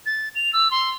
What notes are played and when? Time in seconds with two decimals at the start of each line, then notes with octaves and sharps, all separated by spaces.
0.06 A6
0.35 F7
0.53 E6
0.71 C6